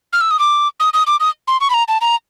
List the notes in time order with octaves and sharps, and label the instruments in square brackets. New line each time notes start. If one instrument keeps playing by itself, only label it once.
[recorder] F6
E6
D#6
D6
D#6
D#6
D6
D#6
C6
C#6
B5
A#5
A5
A#5